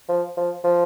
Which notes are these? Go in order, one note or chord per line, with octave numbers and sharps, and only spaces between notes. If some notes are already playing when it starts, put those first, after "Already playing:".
F3
F3
F3